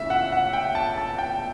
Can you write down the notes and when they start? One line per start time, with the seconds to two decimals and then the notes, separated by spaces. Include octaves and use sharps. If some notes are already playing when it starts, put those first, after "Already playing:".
Already playing: C#3 E3 A3 C#4 E5
0.10 F#5
0.32 F#5
0.53 G5
0.75 A5
0.98 A5
1.18 G5